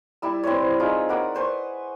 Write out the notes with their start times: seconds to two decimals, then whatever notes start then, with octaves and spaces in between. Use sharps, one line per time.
0.22 G3 E4 E6
0.44 C4 E4 B4 C#5
0.79 D#4 F4 G#4
1.09 A#4 D5 F#5 B5
1.34 B4 C5 C#6